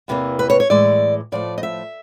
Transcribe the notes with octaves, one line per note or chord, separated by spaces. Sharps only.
E2 C3 E3 G3 A#3
B4
C#5
C#5
A2 E3 G#3 D5
A2 F3 A3 D5
D#5
E5